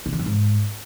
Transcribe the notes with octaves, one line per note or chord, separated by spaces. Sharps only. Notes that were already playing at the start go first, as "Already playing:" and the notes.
C3
D#3
F#2
G#2